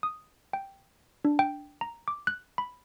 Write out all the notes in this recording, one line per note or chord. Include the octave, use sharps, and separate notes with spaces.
D#6
G5
D4
G5
A#5
D6
F#6
B5